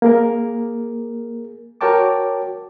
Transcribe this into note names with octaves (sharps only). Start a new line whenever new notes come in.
A#3 G#4 A#4
F#4 A#4 C#5 G5 A5 D6